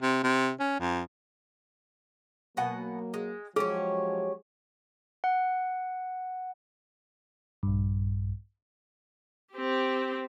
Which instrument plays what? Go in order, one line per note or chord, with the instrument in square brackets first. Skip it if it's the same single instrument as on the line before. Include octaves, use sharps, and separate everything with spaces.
[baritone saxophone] C3
C3
C#4
F2
[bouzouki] B2 F#5 G#5 [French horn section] F#3 A#3
[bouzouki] G#3
[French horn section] F3 F#3 G#3 [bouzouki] C#4 G4 C#5 [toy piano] G#4
[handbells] F#5
[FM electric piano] A#1 G2
[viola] C4 G4